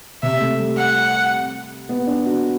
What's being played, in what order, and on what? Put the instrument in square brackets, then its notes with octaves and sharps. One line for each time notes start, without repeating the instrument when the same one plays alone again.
[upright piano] C3 [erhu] E5
[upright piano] A3
G3
[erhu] F#5
[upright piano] B3
D4
F#4